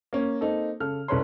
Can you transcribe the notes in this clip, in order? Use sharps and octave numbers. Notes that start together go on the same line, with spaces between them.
A#3 C#4
A#3 C4 D#4 A4
C#3 A4 F6
C2 C#4 A4 B4 C#5 C6